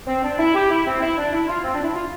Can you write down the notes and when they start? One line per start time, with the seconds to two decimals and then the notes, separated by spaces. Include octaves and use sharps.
0.07 C4
0.23 D4
0.38 E4
0.55 G4
0.70 E4
0.86 C4
1.01 E4
1.17 D4
1.32 E4
1.48 F4
1.63 C4
1.75 D4
1.84 E4
1.94 F4